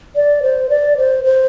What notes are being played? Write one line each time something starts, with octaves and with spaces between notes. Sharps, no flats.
D5
C5
D5
C5
C5